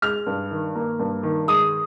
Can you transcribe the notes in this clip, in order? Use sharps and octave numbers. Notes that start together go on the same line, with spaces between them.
G#3 F6
G2
D#3
A#3
G2
D#3
G#3 D#6